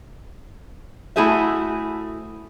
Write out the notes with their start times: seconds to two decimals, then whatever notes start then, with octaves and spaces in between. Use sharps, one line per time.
1.16 A3 E4 F#4 G#4 C5 E5